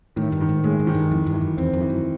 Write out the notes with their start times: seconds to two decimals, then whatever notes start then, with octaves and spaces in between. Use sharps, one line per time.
0.16 A2 D#3
0.32 G2
0.41 D#3
0.49 G#2
0.64 A2 G#3
0.79 G#2
0.87 D#3
0.95 G2
1.11 F2 E3
1.26 G2
1.34 E3
1.41 F#2
1.57 E2 C4
1.73 F2
1.81 E3
1.89 F#2